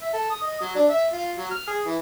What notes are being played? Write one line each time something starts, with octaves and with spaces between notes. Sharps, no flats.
E5
A4
D#6
D#5
F#3
D4
E5
F4
F#3
F6
G#4
E3